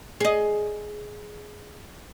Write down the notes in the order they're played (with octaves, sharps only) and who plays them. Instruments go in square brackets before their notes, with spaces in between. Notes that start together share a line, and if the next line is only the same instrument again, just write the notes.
[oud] G#4 D#5